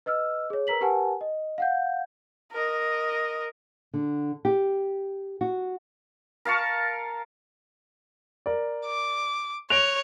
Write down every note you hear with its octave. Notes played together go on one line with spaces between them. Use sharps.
B4 D#5 E6 F6
G#4 C#5
A#4 B4 A#5 B6 F#7
G4 A#4 B4 F#5 G#5 A5
D#5
F5 F#5 G6
A#4 D#5
D3
G4
F#4
A#4 F5 A5 C#6
A#4 D5
D6
C#5 F#6 A#6 D7 F7